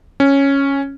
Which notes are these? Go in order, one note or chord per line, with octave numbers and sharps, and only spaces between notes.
C#4